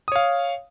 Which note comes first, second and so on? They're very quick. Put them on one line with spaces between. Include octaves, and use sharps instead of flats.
D#6 C#5 F5